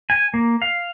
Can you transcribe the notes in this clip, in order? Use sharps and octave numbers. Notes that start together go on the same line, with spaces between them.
G#5
A#3
F5